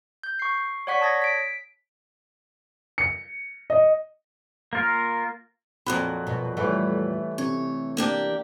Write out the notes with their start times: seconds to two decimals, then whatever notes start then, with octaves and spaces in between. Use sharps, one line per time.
0.23 G6
0.39 C#6 C7
0.87 C#5 D5 F#5 C#6 B6
1.00 C#5 A5 D#6 G#6 A#6
1.22 B6 D7
2.98 C#7
3.70 D#5
4.73 A#3 F4 A#4
5.86 F2 A#2 F#3 B5 F#6
6.27 B2
6.57 E3 G3 A3 B4 C#5 C#6
7.38 C3 C#5
7.97 A#3 D4 G4